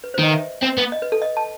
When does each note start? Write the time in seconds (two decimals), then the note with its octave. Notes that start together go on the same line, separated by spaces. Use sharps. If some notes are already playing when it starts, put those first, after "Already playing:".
0.04 B4
0.14 C5
0.19 D#3 D#5
0.34 E5
0.63 C4
0.78 B3
0.92 D#5
1.02 B4
1.12 A4
1.22 D#5
1.37 A5